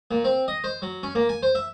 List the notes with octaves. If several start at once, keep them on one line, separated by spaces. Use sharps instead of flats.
A#2
C4
D#5
C5
F#3
C#4
A#3
G#5
C5
E5